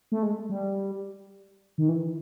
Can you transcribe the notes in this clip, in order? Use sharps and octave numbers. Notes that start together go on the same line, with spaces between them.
A3
G#3
G3
D#3
E3